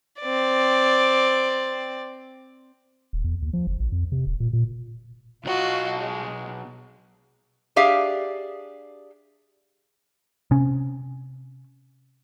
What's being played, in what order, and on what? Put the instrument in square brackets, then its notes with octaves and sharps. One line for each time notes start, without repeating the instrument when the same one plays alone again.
[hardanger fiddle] C4 D5
[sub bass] D#1
E2
D#2
F3
F#1
A#1
F2
C3
D#1
A#2
A#2
[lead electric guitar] B1 D#5 [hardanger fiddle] F4 F#4
[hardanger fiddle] G#3
[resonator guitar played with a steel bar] D4 G4 G#4 E5 F5
[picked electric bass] C3 C#4